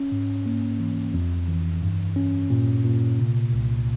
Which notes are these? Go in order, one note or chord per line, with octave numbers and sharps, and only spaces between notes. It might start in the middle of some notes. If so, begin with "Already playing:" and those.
Already playing: C#4
G#2
A#3
E3
F2
E3
G2
C#4
A#2
A#2
C3
C2